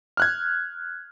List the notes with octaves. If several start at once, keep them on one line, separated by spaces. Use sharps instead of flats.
F6 F#6 G#6